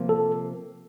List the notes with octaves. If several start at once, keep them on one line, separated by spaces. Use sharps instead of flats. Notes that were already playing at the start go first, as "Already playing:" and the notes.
Already playing: C3 F3 A#3
A4